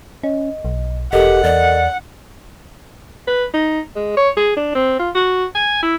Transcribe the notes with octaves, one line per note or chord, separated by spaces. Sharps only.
C#4 D#5
B1
E1 G4 A4 A#4 D#5 F#5
E2 D5
B4
D#4
G#3
C#5
G#4
D4
C4
F4
F#4
G#5
E4